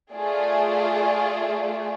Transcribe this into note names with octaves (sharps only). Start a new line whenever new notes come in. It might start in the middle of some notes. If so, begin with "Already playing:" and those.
A3 F4 G#4 D5